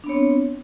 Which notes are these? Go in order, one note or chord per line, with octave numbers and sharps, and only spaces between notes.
B3 C4 D4 C#5